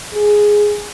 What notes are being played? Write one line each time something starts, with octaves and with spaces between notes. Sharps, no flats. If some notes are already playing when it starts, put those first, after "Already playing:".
G#4